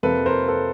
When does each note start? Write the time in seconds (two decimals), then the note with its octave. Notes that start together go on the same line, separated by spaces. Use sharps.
0.03 F2 C3 F3 A#3 A4 B4
0.26 A#4 C5
0.48 A4 B4